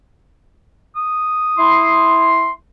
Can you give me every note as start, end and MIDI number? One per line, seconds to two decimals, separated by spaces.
0.96 2.37 87
1.58 2.50 64
1.58 2.50 84